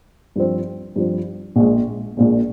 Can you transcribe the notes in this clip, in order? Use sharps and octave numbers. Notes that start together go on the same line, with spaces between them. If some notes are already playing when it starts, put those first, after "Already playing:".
G2 F3 C4
G2 F3 C4
A#1 A#2 G#3
A#1 A#2 G#3